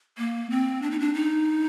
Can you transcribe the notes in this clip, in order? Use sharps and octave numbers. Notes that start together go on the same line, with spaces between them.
A#3
C4
D4
D#4
D4
D#4